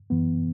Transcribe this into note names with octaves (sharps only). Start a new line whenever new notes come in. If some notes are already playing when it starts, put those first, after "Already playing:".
F#2 E3 B3